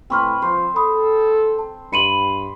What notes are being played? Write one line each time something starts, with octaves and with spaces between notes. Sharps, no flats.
A2 C4 B4 C6 C#6 F6
F3 C5
A4 B5 D#6
A5
G2 B5 C6 D6 C#7 D#7 F#7